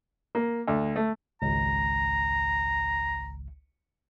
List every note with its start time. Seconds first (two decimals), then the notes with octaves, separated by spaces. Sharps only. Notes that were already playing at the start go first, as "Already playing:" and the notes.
0.35 A#3
0.68 D2
0.96 A3
1.42 G#1 C#2 A#5